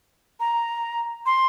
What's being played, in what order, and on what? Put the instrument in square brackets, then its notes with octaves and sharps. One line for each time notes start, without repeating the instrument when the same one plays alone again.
[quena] A#5
C6